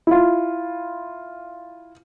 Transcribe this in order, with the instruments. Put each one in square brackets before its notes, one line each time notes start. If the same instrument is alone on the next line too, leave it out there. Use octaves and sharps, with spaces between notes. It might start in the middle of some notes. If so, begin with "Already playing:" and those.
[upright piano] E4 F4